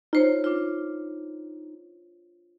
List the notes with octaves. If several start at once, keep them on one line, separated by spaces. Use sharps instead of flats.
D#4 F4 C5 C#5
D4 F4